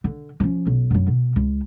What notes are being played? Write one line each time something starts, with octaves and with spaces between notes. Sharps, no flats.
D3
F3 C#4
B1
F#2 F#3
B2
C#2